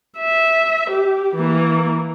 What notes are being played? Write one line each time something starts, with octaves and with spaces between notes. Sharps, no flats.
E5
G4
E3 A#3